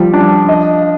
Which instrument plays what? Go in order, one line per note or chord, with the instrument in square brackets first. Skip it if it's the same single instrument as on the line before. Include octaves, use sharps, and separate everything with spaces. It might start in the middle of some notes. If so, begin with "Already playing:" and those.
Already playing: [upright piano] F3 [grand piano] G3
[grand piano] D4
D#5